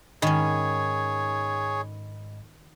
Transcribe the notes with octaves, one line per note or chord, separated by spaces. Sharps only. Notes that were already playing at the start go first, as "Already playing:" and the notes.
G#2 D#3 C#4 G#4 C#5 D#5 B5